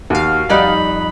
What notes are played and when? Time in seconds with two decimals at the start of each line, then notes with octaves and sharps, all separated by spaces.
0.10 D#2 F#4 F5
0.50 F2 G3 D#4 D5 B5 F#6